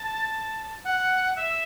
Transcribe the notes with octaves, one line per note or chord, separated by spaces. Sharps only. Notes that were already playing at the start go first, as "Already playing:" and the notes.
Already playing: A5
F#5
E5